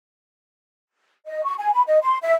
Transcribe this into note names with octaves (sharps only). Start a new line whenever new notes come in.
D#5
C#6
G#5
B5
D#5
C6
E5